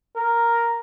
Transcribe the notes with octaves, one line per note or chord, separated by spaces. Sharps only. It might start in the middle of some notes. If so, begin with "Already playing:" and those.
A#4